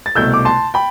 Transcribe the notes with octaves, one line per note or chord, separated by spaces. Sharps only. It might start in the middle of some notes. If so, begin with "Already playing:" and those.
A6
C2 B2 A3 E6 G6
D6
A5 C6
G5 B5